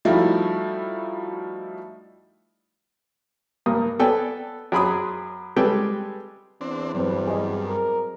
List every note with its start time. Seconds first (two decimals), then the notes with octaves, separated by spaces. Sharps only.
0.05 F3 G3 A3 D#4 E4 F#4
3.66 G2 A#3 D#6
3.99 B3 A4 D5 G5 G#5
4.72 F#2 G#4 B5 C6 D#6
5.57 G3 G#3 A4 B4 G5
6.61 E2 C4 D4
6.95 G2 F#3 C4 B4
7.27 G#4 D#5
7.66 A#4